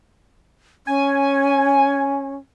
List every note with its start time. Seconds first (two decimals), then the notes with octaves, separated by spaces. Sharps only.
0.87 C#4 G#5